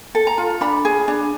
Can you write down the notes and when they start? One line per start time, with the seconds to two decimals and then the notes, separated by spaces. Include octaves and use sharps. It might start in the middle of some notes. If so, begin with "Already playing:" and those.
0.15 A4
0.27 A#5
0.38 F4
0.61 D4 B5
0.85 G#4
1.08 D4